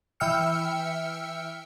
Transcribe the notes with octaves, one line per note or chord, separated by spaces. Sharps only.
E3 E5 G5 E6 F6 C#7